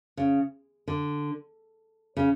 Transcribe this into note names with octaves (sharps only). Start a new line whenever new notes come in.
C#3
D3
C#3